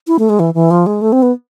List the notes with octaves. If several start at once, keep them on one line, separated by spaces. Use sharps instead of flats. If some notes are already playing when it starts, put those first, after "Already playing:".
E4
A3
G#3
E3
E3
F3
G#3
A3
C4
B3